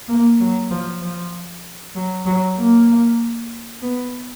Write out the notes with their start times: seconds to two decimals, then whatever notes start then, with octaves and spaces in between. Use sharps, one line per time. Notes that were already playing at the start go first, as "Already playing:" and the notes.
0.08 A#3
0.40 F#3
0.71 F3
1.02 F3
1.95 F#3
2.26 F#3
2.57 A#3
3.82 B3